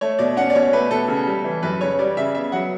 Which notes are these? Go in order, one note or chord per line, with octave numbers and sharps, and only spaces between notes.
A3 C#5
B2 D5
C#4 F#5
D5
B2 C#5
A3 B4
B2 A4
C#3
G3
E3
F#2 B4
C#3 C#5
G3 D5
C#3 E5
B3 E5
F#3 F#5